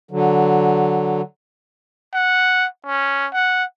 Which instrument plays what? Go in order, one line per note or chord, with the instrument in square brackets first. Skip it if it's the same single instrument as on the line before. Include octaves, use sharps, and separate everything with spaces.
[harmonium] D3 F#3
[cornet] F#5
C#4
F#5